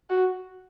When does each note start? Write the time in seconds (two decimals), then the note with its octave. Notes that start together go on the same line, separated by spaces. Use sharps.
0.10 F#4